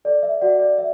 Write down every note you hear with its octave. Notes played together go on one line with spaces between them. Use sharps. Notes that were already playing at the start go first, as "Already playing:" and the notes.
A4 D5
E5
F#4 D5 F#5
D5
D5 E5